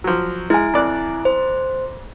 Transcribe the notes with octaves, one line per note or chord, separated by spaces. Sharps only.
F3 F#3
G#3 E4 G#5
F2 D5 F#6
C5